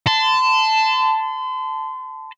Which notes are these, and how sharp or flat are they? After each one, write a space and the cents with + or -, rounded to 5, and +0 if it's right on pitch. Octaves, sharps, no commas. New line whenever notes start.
A5 +0 C6 -35